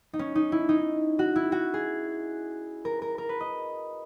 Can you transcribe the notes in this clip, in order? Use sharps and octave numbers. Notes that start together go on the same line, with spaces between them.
D#4
C#4
D#4
E4
D#4
F#4
E4
F#4
G#4
A#4
A#4
A#4
B4
D#5